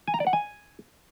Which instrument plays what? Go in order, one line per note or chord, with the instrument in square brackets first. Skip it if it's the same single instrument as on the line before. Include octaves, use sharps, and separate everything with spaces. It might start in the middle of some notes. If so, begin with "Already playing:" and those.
[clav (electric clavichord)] G#5
A#5
D5
F#5
G#5